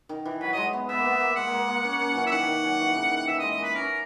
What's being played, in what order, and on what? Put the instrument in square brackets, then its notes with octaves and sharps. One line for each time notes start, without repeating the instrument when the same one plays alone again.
[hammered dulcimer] D#3
E3
[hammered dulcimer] F#3 [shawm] B4
[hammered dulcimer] F#3 G#3 [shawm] D#5
[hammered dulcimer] B3
[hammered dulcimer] B3 [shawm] E5
[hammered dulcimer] A#3
B3
A#3
[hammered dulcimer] G#3 [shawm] F#5
[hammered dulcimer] A#3
G#3
A#3
C#4
C#4
E3 F#3
[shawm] E5
[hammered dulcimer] D#3 [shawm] F#5
[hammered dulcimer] D#3
F#3
E3
C#3
D#3
[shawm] F#5
[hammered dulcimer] E3 [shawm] E5
[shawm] D#5
[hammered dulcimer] G#3
[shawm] D#5
[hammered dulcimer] A#3 [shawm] B4
[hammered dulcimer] C#4 [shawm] A#4